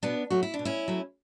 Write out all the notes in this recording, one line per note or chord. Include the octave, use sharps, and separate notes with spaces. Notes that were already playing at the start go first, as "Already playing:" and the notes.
B2 B3 D4
F#3 A3 F#4
E4
D4
B2
C#4 E4
F#3 A3